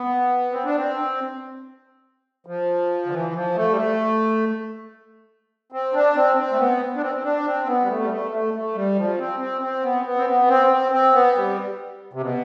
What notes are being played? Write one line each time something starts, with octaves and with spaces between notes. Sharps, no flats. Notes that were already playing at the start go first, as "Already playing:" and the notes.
Already playing: B3
C4
D4
C4
F3
D3
E3
F3
A3
G3
A3
C4
D4
C4
C4
A3
B3
D4
C4
C4
D4
C4
B3
G3
A3
G3
A3
A3
A3
G3
F3
C4
C4
C4
B3
B3
C4
B3
C4
C4
C4
B3
G3
C3
B2